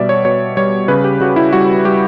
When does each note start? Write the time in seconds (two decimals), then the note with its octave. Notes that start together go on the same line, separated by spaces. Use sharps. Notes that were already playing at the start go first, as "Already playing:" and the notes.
Already playing: B2 G3 D5 E5
0.09 C#5
0.25 B2 C#5
0.57 G3 C#5
0.88 C#3 B4
1.04 G4
1.20 C#3 F#4
1.36 E4
1.53 G3 F#4
1.85 G3 G4